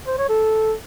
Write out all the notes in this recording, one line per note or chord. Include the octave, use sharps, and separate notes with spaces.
C5
C#5
A4